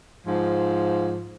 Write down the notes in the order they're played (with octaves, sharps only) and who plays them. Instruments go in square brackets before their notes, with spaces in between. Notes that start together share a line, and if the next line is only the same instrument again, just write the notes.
[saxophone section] G#2 F3